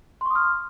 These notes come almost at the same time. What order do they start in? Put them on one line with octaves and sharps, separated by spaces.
C6 C#6 D#6 F6